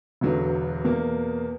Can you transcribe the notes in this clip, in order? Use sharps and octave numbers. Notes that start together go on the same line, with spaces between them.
E1 E2 D3 F#3
E2 B2 A#3